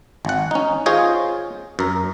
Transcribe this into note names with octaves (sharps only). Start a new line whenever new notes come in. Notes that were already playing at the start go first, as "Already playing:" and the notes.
G#1 F#5
C#4 D#4
F4 G#4 C5 C#5 D#5
F#2 A#4